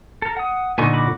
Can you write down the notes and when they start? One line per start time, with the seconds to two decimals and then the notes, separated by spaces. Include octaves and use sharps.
0.22 A4 A#4
0.37 F#5 D#6
0.78 A#2 D3 B3 D#4 G#5 C#6
0.93 F#4 B5 D6